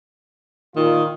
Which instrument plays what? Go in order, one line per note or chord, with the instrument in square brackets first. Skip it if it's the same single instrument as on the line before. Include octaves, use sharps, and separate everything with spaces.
[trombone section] A#2 F4 [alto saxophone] D#3